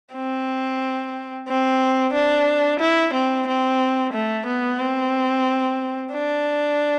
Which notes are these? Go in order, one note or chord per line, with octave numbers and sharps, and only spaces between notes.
C4
C4
D4
E4
C4
C4
A3
B3
C4
D4